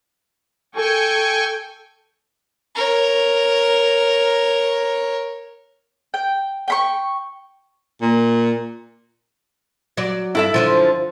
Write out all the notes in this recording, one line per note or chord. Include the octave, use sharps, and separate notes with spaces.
A4 G5 G#5 C#6
A#4 C#5
G5
G5 B5 C#6
A#2
F#3 D5
G2 E4 A4 E5
F#2 D3 F3